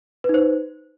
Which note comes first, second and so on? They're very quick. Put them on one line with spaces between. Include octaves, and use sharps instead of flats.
B4 D#4 C5